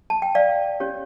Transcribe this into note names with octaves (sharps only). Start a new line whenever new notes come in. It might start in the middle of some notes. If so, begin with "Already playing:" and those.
A5
G5
D5 F5
C#4 G4 C#5